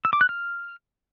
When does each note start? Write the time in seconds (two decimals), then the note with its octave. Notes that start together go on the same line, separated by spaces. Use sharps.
0.05 E6
0.13 D6
0.21 F#6
0.29 F6